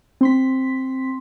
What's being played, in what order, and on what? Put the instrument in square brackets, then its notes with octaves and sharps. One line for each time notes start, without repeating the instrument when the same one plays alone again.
[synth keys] C4 C6 B6